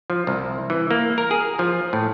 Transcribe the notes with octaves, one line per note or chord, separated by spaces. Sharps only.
F3
C2
E3
A#3
A#4
G#4
F3
A2